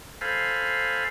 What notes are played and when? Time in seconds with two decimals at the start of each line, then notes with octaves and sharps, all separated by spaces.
0.21 A4 C5 F5 G#5 B5